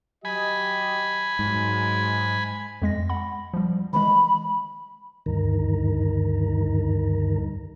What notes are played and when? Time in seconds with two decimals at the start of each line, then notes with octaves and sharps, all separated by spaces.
0.25 F#3 G4 D#5 G#5 B5
1.39 G#2 F#3 G#3
2.82 F2 G#3 A#6
3.09 F#5 B5
3.53 F3 G3
3.93 D#3 E3 G#3 B5
5.26 D2 G2 D#3 A#4